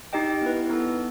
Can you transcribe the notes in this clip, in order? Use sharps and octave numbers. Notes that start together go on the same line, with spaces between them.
D#4 G4 D#5 G5
B3 E4 B4
B3 D#4 A4